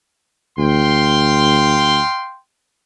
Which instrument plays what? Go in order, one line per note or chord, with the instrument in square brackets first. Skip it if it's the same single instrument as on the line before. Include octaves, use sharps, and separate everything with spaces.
[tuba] D2 [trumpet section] F5 G5 C6